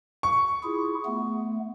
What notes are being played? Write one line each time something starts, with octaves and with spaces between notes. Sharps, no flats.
C#6
E4 F4 G#4
A3 B3